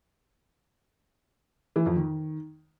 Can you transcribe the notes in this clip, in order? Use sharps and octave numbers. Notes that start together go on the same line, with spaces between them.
E3
F2
D#3